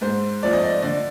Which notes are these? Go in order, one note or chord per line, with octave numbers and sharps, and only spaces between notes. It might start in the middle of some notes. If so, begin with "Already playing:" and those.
G#2 C5
F3 A3 C4 D5
D#5
D5
D3 D5